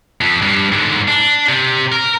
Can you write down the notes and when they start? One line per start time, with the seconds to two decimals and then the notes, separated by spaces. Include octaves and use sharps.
0.21 F2
0.42 G2
0.72 G#2 D3
1.08 D4
1.49 C3
1.92 A#4